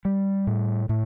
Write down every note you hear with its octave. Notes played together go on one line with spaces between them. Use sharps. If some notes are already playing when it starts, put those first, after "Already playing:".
G3
A2
A2